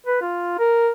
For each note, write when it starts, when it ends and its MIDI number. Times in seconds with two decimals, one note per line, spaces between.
0.06 0.19 71
0.21 0.56 65
0.59 0.90 70